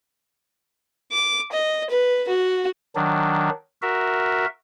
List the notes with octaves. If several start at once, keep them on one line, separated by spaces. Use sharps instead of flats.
D6
D#5
B4
F#4
D#3 F#3 D4
F#4 A#4 E5